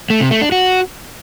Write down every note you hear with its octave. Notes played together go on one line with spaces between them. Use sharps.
A3
C3
A3
D4
F#4